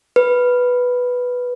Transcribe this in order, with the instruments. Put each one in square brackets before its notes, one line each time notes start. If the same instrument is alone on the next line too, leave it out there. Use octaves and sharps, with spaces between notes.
[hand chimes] B4